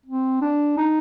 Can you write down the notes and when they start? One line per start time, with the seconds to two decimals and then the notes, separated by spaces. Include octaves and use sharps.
0.06 C4
0.42 D4
0.77 D#4